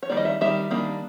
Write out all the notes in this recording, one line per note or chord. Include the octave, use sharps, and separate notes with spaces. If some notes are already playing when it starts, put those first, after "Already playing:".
C#5
D#3 G3 A#3 D5
D#5
E5
D#3 G3 E5
D#3 G3 A#3 D4